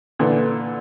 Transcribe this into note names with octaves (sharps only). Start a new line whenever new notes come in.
A#2 D3 E3